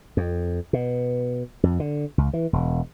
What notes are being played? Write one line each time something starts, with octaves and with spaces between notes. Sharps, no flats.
F2
B2
F2
D3
C#2
E3
E1